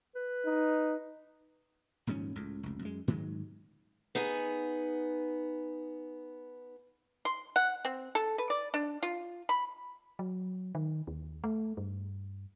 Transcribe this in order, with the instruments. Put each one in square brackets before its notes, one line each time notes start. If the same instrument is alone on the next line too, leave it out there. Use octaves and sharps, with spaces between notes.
[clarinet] B4
[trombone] D#4
[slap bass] D#1 G#2 F3 C#4
C#2 A2
F1 C#2
F#2 G#3
G#2 D#3 F#3 G#3
[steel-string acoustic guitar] B3 D#4 G#4 G#5
[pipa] C6
F#5
C4
A4
B4
D5
D4
F4
B5
[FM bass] F#3
D#3
D#2
A3
G2